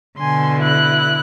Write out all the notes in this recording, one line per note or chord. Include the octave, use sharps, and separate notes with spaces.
B2 D3 G#5 C6
E4 F#6